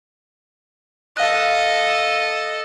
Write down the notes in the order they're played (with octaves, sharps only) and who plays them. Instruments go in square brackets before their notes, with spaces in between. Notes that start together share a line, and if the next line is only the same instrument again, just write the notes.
[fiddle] A4 D#5 [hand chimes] F5 F#6